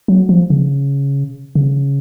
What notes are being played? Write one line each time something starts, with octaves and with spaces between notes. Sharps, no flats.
F#3
F3
C#3
C#3